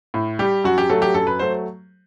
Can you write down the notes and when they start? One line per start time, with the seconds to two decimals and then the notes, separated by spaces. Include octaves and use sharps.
0.14 A2
0.39 G3 G4
0.64 F#2 F#4
0.78 G4
0.90 F#3 A3 A4
1.02 G4
1.14 F#2 A4
1.27 B4
1.39 F#3 A3 C5